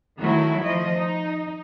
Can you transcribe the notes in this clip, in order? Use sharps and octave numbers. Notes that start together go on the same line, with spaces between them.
D#3 F#3 A3 E4 F#4
F3 D#5
D#4